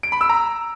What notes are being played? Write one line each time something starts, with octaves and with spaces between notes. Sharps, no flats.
D7
B5
E6
A#5